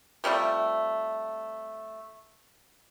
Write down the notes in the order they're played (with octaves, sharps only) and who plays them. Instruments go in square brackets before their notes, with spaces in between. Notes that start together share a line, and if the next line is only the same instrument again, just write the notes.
[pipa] C3 F3 G3 A3